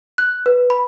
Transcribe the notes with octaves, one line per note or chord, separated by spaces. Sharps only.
F#6
B4
B5